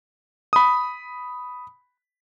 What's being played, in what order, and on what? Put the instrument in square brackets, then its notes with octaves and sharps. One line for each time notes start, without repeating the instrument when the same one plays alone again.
[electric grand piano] B5 D#6